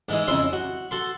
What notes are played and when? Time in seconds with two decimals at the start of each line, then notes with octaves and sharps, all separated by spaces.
0.09 G#2 E3 G#3
0.28 F2 C#3 E4 C6
0.53 F#4
0.91 F#4 A4 C6